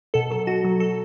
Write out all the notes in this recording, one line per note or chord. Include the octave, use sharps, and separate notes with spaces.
B2 A4
F#3 A4
B2 F#4
F#3
A4